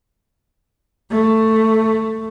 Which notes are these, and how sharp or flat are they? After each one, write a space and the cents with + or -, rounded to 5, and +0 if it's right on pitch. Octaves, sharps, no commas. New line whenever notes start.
A3 +10